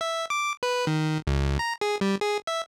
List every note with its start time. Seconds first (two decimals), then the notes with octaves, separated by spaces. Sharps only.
0.01 E5
0.30 D6
0.63 B4
0.87 D#3
1.27 C#2
1.59 A#5
1.81 G#4
2.01 G3
2.21 G#4
2.47 E5